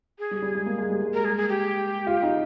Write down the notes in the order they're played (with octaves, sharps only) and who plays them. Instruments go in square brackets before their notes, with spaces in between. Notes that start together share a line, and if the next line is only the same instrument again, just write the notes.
[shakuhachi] G#4
[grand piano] G3
G3
G#3
A#3
G#3
G3
G#3
[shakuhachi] A#4
G#4
G#4
G4
[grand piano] F4
D#4